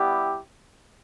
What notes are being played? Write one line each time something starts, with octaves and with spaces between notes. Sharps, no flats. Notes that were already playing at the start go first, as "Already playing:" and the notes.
Already playing: G3 B3 E4 G4